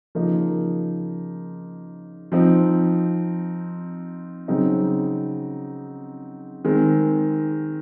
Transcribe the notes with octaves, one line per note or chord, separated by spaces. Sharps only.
C#3 F3 A#3 D#4
F3 C4 D#4
C#3 F#3 C4 D#4 F#4
D#3 G#3 C4